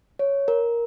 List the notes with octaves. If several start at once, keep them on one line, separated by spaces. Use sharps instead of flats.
C#5
A#4